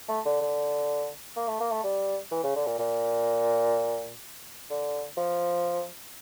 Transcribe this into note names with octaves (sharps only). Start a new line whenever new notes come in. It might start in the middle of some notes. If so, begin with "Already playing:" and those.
A3
D3
D3
A#3
A3
A#3
A3
G3
E3
C#3
D3
A#2
A#2
D3
F3